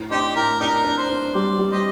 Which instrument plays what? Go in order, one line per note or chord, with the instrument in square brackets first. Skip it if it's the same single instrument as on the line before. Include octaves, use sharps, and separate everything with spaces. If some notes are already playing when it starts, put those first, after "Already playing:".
Already playing: [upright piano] A2
[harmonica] C4 D#4 G4 [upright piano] D4
[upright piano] A2 [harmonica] A#4
[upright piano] D4 [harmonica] D#4 G4 A#4
[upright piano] D4
[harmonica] C5
[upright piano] D4
[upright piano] G3 [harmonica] D5
[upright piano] G3
[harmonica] G4 C5 D#5